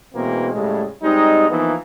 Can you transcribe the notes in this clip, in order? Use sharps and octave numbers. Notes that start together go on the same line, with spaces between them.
B2 E3 G#3 A#3 C4
A2 C#3 G3 G#3
G3 G#3 C4 D#4
E3 F3 A#3 B3 D#4